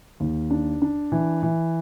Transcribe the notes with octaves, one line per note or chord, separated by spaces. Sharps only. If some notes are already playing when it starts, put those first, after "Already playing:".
D#2
D4
D4
E3
E3